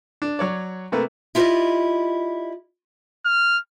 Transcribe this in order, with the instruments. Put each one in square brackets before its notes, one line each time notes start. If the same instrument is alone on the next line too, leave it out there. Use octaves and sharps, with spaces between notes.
[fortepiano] D4
F#3 C#5 D5
C3 A3 A#3 B4
[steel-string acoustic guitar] E4 F4 G4 C5 D5 D#5
[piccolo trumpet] F6